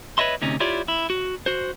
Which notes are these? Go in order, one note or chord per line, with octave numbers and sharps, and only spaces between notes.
B4 C#5 D#5 E5 C6
D2 C3 C#4 D#4
E4 F4 G4 C#5 D5
E4
F#4
F#4 C5